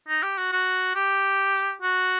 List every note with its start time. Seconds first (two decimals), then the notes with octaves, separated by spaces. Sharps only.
0.08 D#4
0.23 G4
0.38 F#4
0.52 F#4
0.95 G4
1.82 F#4